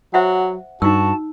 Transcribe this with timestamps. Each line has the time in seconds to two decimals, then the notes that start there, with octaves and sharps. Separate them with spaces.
0.14 F#3 C5 E5 F#5
0.82 G2 D#4 F#4 A5 E6